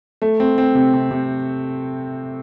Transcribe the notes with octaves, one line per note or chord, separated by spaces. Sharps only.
A3
C4
C4
C3
C3
C3